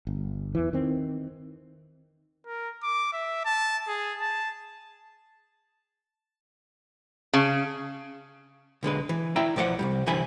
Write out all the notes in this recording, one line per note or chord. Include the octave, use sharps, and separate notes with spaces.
G1
E2 E3
D#3 C4
A#4
D6
E5
A5
G#4
A5
C#3
B1 D3 G#3 B4
E3
E4 D5 E5 G5 A#5
B1 F3 D5 E5 F#5
C2 F#2 G3
C2 D3 E3 G3 G#5 B5